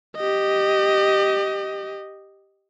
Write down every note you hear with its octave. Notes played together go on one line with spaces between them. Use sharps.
G4 D#5